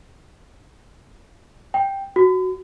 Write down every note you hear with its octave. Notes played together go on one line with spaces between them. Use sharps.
G5
F#4